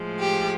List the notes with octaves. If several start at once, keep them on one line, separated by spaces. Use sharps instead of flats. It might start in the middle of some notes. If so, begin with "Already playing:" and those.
Already playing: A2 F3 G#3
G4